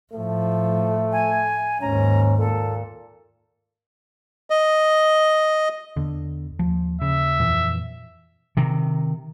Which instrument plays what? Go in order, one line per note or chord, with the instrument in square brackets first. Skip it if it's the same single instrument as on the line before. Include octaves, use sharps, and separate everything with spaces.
[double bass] A2 F3 [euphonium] A3
[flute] G#5
[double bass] D#2 G#2 [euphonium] C#4 [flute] A#5
[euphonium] A#2 [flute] A4
[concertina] D#5
[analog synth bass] E2 [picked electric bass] D3
[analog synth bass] D#2 [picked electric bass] F3
[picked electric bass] C#3 [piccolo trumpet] E5
[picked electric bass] F2 A#2 E3
[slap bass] C3 D#3